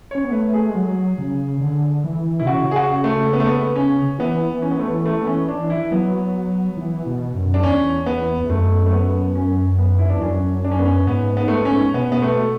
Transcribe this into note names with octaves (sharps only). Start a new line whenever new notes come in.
C#4 C#5
B3
A3 B4
G#4
G#3
F#3
C#3
D3
E3
B2 E4
C#3 F#4
G#4
F#4
A3
B3
A3
B3
C#4
E3 B3
C#4
B3
A3
B3
A3
B3
C#4
D4
E4
F#3 B3
E3
B2
F#2
D4
E2 C#4
B3
E2
F#2 A3
A3
B3
C#4
B3
E4
E2 D4
F#2 C#4
D4
C#4
B3
C#4
G#2 B3
B3
A3
B3
C#4
B2 B3
B3
A3